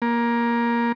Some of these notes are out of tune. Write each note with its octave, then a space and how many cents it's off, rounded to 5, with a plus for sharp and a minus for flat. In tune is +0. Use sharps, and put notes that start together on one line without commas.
A#3 +15